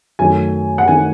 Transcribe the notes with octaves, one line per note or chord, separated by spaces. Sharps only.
F#2 D#3 A3 G#5
F#5
D#3 A3 G#5